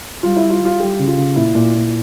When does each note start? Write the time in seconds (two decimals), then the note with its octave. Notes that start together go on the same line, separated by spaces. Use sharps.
0.23 G3 F4
0.36 G3 E4
0.50 F4
0.60 G3
0.65 F4
0.80 G3 G4
0.99 C#3
1.08 F4
1.17 C#3
1.36 A#2 E4
1.55 A#2
1.75 A#2